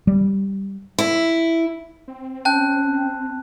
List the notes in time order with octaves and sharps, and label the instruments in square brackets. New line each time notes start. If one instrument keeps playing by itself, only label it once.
[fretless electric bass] G3
[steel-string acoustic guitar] E4
[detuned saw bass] C4
[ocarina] C#4 [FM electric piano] G5 [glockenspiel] A5 F#6